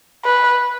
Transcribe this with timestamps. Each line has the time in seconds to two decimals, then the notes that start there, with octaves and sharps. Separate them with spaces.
0.24 B4